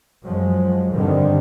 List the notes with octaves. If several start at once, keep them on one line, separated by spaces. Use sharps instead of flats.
F#2 F3 F#3 G#3
G2 D3 D#3 G3 C4